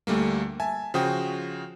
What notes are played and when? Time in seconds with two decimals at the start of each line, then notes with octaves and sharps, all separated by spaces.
0.07 D2 G3 A3 A#3
0.60 E5 G#5 A5
0.94 C#3 F3 F#4 C5 G5 D#6